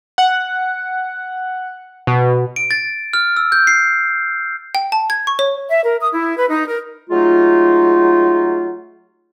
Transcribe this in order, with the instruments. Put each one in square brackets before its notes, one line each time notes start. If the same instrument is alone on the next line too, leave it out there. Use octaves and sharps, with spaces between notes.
[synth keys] F#5
B2
[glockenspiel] D7
A6
F6
E6
G6
C7
[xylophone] G5
A5
G#6
C#6
C#5
[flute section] E5
A#4
D#6
E4
B4
D#4
A#4
[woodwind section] F#3 G#3 A3 D#4 F4